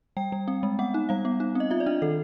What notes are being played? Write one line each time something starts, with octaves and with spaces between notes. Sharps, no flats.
G3 G5
G3
C4
G#3
B3 F#5
D#4
G3 F5
B3
D#4
C4 D#5
F4 E5
D5
D4 D#5
D#3 A4